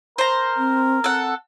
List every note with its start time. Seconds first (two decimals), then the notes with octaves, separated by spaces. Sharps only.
0.18 A#4 C5 A#5
0.57 C4
1.04 C4 A4 F#5